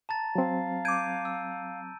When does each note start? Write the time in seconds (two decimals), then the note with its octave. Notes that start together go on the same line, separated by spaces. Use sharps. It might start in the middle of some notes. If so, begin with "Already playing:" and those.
0.09 A5 A#5 A6
0.35 F#3 C4 F5
0.85 D6 G6 G#6 D7 D#7
1.25 E6